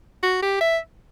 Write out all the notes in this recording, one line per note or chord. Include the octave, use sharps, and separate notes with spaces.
F#4
G4
E5